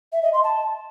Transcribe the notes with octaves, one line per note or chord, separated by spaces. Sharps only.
E5
D#5
C6
A5